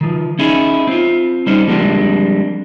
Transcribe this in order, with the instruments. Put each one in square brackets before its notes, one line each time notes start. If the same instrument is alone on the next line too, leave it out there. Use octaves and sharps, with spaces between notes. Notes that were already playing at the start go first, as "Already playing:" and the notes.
[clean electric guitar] D#3 F3
C#4 D#4 E4 G#4
C4 F4
G3 C#4 D#4 C5
F3 G3 G#3 A#3 C4 D4